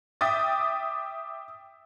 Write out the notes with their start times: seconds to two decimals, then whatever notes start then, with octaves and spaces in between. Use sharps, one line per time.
0.21 E5 G5 D6 D#6 A6